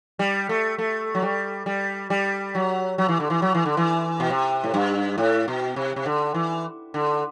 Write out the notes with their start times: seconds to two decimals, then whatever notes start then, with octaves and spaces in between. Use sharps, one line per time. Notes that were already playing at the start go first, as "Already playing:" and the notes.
0.19 G3
0.49 A3
0.78 A3
1.15 F#3
1.22 G3
1.66 G3
2.10 G3
2.55 F#3
2.98 F#3
3.09 E3
3.20 D3
3.30 E3
3.42 F#3
3.54 E3
3.66 D3
3.77 E3
4.20 B2
4.30 C3
4.64 A2
4.74 G2
5.18 A2
5.48 B2
5.76 C3
5.96 C3
6.06 D3
6.34 E3
6.94 D3